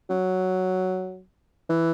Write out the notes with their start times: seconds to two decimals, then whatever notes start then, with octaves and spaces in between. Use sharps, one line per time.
0.10 F#3
1.70 E3